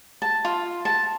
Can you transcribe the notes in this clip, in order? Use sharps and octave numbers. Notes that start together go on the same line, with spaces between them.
A5
F4
A5